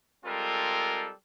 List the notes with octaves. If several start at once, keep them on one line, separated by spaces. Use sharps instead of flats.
G3 G#3 C4 F4 A4 A#4